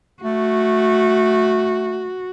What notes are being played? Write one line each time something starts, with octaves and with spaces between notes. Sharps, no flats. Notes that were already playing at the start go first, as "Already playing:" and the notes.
A3 F#4